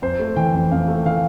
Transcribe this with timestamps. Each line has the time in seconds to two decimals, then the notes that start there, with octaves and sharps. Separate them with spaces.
0.02 F2 C5
0.19 A3
0.36 E3 G5
0.53 F2
0.71 F2 F5
0.88 A3
1.06 E3 F5